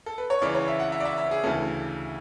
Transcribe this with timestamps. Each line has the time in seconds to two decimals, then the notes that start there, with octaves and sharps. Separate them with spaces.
0.06 A4
0.18 B4
0.30 C#5
0.42 C#2 C#3 E3 D5
0.55 C#5
0.68 E5
0.80 F#5
0.92 E5
1.00 D5
1.05 E5
1.18 E5
1.31 G#4
1.43 D2 C#3 E3 A4